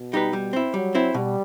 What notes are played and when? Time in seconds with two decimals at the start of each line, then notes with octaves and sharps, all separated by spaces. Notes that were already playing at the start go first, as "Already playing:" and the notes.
Already playing: B2
0.13 G3 D#4 G4 B4
0.33 G3
0.53 C4 E4
0.74 F#3 G3
0.95 C4 E4
1.14 B2 G3